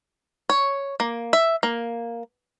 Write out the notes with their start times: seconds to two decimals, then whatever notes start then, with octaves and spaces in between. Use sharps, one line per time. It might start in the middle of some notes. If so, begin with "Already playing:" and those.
0.49 C#5
1.00 A#3
1.33 E5
1.63 A#3